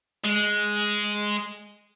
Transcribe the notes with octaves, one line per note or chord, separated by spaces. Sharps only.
G#3